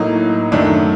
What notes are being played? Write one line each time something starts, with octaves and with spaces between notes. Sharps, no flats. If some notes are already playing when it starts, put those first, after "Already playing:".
Already playing: A2 F#3 A#3 D#4
F#2 D#3 F#3 A3 D4